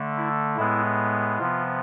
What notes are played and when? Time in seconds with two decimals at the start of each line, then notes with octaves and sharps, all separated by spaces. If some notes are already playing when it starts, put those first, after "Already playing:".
Already playing: D3 A3
0.17 E4
0.57 A2 G#3 B3 E4
1.39 C3 F3 B3 F4